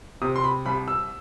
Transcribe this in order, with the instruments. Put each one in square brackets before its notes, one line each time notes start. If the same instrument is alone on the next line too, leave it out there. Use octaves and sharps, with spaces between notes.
[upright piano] C3 D#6
C6
B5
C2 B5
E6